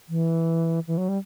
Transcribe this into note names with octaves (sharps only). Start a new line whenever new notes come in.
E3
E3
F#3
G3